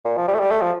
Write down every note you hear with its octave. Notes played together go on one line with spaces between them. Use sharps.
A#2
F3
G3
A3
G3
A3
F3